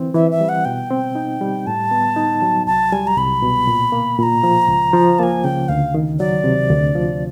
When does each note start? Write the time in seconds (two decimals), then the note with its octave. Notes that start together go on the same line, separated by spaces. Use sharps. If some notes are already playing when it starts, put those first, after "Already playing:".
Already playing: E3 C4
0.14 E3 E5
0.31 E5
0.41 G3
0.49 F#5
0.65 B2 G5
0.90 C4
1.15 D#4
1.41 G3
1.67 A2 A5
1.91 B3
2.16 D#4
2.42 F#3
2.67 C2 A5
2.92 G3 G#5
3.07 A#5
3.18 C2 B5
3.42 B2
3.67 A#2
3.92 A#3
4.18 A#2 A#5 B5
4.43 F3
4.68 C#2
4.93 F3
5.19 A#3 G#5 A5
5.44 C#3 G5
5.69 D2 F5
5.94 D#3
6.19 F#3 D5
6.44 C3
6.70 D2
6.95 F3